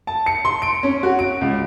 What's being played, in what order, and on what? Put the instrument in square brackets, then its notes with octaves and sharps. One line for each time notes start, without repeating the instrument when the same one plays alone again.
[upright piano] A5
C#7
C6
D7
C#4
F#4
D7
C#2